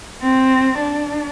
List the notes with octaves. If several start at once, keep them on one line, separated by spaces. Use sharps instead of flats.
C4
D4